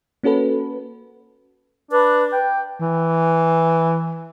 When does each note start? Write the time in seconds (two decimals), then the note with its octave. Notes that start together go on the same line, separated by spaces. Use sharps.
0.23 A#3 C#4 F#4 A4 B4
1.92 D4 B4
2.33 G5
2.80 E3